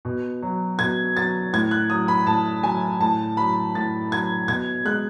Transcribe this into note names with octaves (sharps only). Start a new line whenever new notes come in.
B2
F#3
B2 G#6
F#3 A6
A2 G#6
F#6
F#3 D#6
B5
A2 A5
F#3 G#5
A2 A5
F#3 B5
A2 A6
F#3 G#6
B2 G#6
G#3 F#6